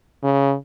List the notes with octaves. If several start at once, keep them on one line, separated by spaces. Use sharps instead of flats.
C#3